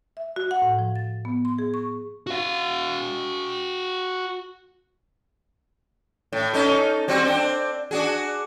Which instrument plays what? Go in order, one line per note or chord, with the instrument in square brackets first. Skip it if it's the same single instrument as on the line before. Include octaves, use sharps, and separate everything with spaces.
[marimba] E5
F#4
F#5
A2
F3
A6
B3
C6
G#4
C#6
[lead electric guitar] F#4 F5
[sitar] A2
C#4 D#4 A4
G3 C4 F#4
C4 D4
D4 F#4 G#4